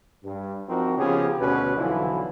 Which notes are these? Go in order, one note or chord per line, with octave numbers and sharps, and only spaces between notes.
G2
F3 C4 D#4 F#4 A#4
C#3 F3 B3 G4 G#4
D2 B2 C#4 F#4 B4
B1 D3 E3 F3 E4